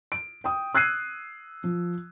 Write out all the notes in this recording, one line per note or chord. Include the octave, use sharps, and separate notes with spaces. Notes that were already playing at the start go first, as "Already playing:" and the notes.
D7
G5 D#6
E6 F#6 G#6 C7 D#7
F3